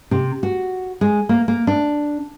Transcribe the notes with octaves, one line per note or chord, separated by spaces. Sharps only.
C3
F#4
G#3
A#3
A#3
D4